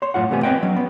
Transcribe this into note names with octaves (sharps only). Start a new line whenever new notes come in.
C#5 C6
F#2 A2 F4 F#5
E2 C3 A3 B3 G4 G#5
B3 C4 B4 D#5 G5
F#3 C#4
B3